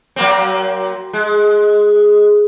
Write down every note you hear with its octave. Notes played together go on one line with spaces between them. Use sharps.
F#3 A#3 C4
G#3